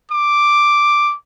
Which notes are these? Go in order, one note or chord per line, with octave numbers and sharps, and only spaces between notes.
D6